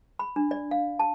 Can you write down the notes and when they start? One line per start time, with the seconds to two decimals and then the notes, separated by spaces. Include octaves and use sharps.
0.19 B5
0.36 D4
0.51 D5
0.71 F5
0.99 A5